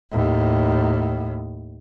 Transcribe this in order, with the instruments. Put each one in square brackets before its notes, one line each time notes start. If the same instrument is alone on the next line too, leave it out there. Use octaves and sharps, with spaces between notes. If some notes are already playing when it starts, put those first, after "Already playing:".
[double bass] D#2 A2